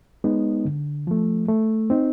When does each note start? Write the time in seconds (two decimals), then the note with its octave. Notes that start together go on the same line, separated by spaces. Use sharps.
0.24 G#3 B3 D#4
0.65 D3
1.07 F3 A3
1.48 A3
1.90 C4 D#4